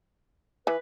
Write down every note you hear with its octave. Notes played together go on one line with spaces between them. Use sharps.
E3 B4